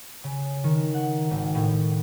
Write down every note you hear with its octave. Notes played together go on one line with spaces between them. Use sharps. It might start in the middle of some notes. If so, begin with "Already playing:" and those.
C#3
D#3
F#5
G#1
A2